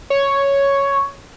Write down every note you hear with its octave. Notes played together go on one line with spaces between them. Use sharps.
C#5